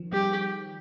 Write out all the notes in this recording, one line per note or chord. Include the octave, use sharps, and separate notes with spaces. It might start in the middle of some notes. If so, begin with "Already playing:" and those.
Already playing: D#3 F3
G3 G4